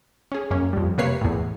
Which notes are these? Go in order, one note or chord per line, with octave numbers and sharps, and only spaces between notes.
C#4 G#4
F#2 A#3 C#4
F2 G3
C3 A#3 B4 C#5 C7
E2 A2